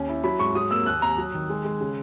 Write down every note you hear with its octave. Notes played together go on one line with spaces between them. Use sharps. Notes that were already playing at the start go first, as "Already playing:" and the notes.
Already playing: D#2 C#4
E4
F#3 B5
G#2 C#6
F#3 D#6
A#3 E6
D#2 F#6
D#2 A#5
F#3
D#3
G#3
G#3
C#3